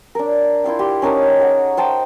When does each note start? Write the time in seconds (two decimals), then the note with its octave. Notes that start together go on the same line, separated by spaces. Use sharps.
0.15 D4 A#4
0.64 E4 F4 F5 G5
0.79 G4 C6
1.02 C#4 D#4 A#4 A5
1.40 G#4 F#5
1.77 C5 G5 A5